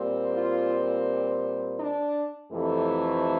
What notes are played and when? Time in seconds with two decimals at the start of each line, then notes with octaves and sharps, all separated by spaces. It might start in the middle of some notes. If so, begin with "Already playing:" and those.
Already playing: A#2 G3 C4
0.32 F4
1.78 D4
2.52 F2 C3 E3 A3